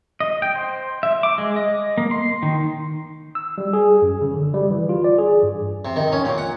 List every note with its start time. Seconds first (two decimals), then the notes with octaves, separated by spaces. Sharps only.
0.20 D#5
0.42 G5
0.55 C5
1.03 E5
1.23 D6
1.38 G#3
1.56 D#5
1.98 A#3
2.11 C6
2.43 D#3
3.35 E6
3.58 G3
3.73 G#4
4.02 F#2
4.22 C#3
4.34 D3
4.54 G3
4.71 E3
4.89 F4
5.04 D5
5.18 G#4
5.43 G2
5.85 C3
5.96 D#3
6.12 C#4
6.25 A#2
6.38 F#5